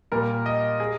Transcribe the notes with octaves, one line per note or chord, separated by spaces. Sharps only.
A#2 G3 A#4
D#5
G#4